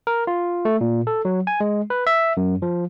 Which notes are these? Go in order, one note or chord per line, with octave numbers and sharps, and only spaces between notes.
A#4
F4
A3
A#2
A4
F#3
G#5
G#3
B4
E5
F#2
F3